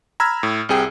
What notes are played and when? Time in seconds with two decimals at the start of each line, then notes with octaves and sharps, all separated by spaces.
0.20 A#5 B5 E6 F6 G#6
0.43 A2
0.69 C2 C3 G#4 G5